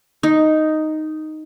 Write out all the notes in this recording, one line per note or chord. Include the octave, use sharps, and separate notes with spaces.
D#4